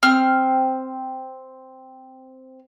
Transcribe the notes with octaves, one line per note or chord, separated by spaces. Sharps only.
C4 F6